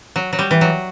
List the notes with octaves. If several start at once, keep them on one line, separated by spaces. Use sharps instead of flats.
F#3
F#3
G3
E3
F#3